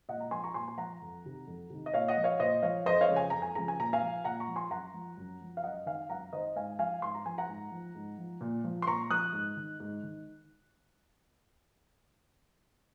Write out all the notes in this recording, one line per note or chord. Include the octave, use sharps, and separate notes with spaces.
A#2 D#5 F#5
F#5 A#5
F3 G#5 C6
A#5 C#6
A#2 G#5 C6
G#5
F3 F#5 A#5
F2
C3 D#3
F2
C3 D#3
D#5
A#2 C#5 F5
D#5 F#5
F3
C#5 F5
A#2 C5 D#5
F3 C#5 F5
F2 C5 D#5
C#5 F5
C#3 F3
G#5
F2 A#5
G#5
C#3 F3 A#5
G#5
A#2 A#5
F5 G#5
F3
A#2 F#5 A#5
A#5 C#6
F3
G#5 C6
F#2 F#5 A#5
F3
F#2
F3
F5
F#2 D#5 F#5
D#3 F5 G#5
F#2 F#5 A#5
D#3 C5 D#5
G#2 F5 G#5
F3 F5 G#5
G#2 C6
A#5
F3 G#5
F#5 A#5
G#2
F3
G#2
F3
A#2
F3
C6
A#2 A#5 C#6
F3 D#6 F#6
G#2
D#3
G#2
D#3